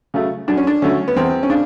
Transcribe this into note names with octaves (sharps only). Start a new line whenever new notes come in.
C#3 F#3 A3
F#2 D4
C#4
D4
D3 F#3 A3 C#4
B3
E2 C4
C#4
C#3 D4